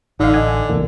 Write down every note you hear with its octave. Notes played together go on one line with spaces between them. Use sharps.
A1 D3 D#4 F5
D#5 G#5
B1 E2 C3 E3 A#3